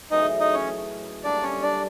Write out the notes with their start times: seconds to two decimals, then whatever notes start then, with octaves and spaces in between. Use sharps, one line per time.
0.11 F#2 C#3 E3 A3 D#4 D#5
0.40 D#4 D#5
0.53 C#4 C#5
1.24 D3 G3 A#3 D4 D5
1.43 C#4 C#5
1.62 D4 D5